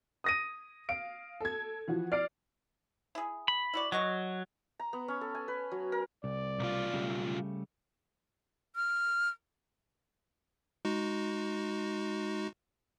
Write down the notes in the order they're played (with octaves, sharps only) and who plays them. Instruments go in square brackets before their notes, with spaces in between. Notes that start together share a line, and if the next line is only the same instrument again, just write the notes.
[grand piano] D#6 A#6 D#7
[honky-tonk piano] F5 [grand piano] D7
[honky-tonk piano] A4 G#6
E3 F3 F#4
[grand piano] D5 [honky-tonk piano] F6 C7 D7
[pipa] E4 G#4
[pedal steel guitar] B5
[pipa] E4 F#4 D5
[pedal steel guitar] F#3 [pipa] F#4 D#5 C#6
[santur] A#5
B3
C#4
A4
G#5
B4
F#3
A#4
[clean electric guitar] C2 [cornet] D5
[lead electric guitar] B1 F4
[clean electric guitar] C#3 G3 A3
[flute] F6
[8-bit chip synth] G#3 D#4 F#4